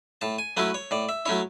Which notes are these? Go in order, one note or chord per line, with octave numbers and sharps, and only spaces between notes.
A2 A5
G#5
F#3 A3 C#4 E4 B4
C#5
A2 D5
E5
F#3 A3 C#4 E4 C#5